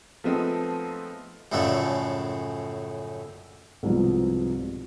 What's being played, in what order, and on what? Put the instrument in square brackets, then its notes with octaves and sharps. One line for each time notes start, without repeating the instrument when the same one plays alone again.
[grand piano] F3 G#3 A3 B3 C4 D#4
[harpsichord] F#2 A2 C#3 F3 A3 D4
[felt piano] C2 G#2 B2 F3